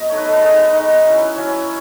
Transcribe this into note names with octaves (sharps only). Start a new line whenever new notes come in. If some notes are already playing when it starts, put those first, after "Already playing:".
Already playing: F#3 B3 D#5
A3 D#4 C#5
B4
A4
B4
G#3 D#4 A4
B4
G#3 D#4 D#5
F#3 C#4 E4
F#3 C#4 E4 C#5